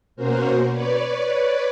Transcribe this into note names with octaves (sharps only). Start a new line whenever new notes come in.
B2 A#3 C#4 F#4 A#4 C5
B4 C#5 D5